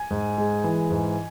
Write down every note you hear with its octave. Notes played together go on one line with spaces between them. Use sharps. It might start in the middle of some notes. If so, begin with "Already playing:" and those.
Already playing: G#5
G#2
G#3
E3
G#2